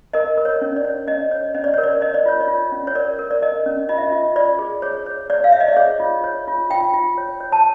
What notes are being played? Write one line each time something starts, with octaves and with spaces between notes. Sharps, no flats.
A#4 D#5
A#4
C#5
C#4
D5
C#5
C#4 D#5
C#5
C#4 D#5
D5
C#5
A#4
D5
C#5 D#5
D5
F4 C#5
D5
F4
C#4
C#5
A#4 D5
A#4
D5
A#4 D#5
C#4
F4 D#5
E5
D#5
F4
F4 D5
G#4
G#4 C#5
C#5
C#5 D5
F5
C#5 E5
D#5
D5
G#4 C#5
F4
C#5
F4
F4 G5
F4
C#5
C#5
A5